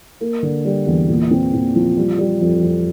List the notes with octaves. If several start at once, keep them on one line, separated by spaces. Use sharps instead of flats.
A#3
D3
G3
E2
A#2
C4
A#2
F3
G3
G3
F2
F2